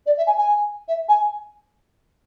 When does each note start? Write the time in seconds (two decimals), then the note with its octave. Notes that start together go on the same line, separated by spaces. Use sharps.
0.06 D5
0.17 E5
0.26 G#5
0.37 G#5
0.88 E5
1.08 G#5